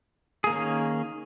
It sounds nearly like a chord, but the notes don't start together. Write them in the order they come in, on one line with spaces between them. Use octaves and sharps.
G#4 A#3 D#3 C#4